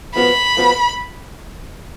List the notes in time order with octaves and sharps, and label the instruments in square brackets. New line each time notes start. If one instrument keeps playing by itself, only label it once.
[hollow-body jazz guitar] F3 B3 F#4 B4 [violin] B5
[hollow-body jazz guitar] F3 B3 F#4 B4